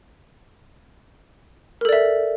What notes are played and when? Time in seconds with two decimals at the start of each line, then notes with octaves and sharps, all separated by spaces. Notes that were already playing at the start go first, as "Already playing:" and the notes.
1.81 A#4
1.85 A4
1.89 D5
1.93 E5